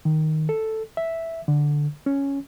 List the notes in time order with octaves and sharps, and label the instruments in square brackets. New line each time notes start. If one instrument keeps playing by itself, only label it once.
[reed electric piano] D#3
A4
E5
D3
C#4